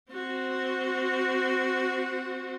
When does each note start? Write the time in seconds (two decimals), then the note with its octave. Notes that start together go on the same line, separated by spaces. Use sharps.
0.12 C4 F#4